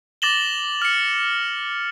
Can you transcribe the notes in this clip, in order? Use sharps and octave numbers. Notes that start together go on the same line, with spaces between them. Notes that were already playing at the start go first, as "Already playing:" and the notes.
D6 A6 A#6 E7 F#7 G7
F6 C#7